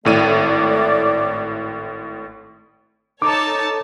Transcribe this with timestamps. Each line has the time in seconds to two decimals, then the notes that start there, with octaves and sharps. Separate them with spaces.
0.05 G#1 A2 A3 D5 D#7
3.22 D#4 A4 C#5 A5 D6